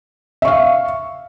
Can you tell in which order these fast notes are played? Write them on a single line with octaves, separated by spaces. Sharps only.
E5 C#6 F5